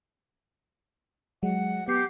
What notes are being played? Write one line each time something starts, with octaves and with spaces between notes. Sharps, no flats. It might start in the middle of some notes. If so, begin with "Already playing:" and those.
F#3 G#3 F#5
B3 G4 C7 C#7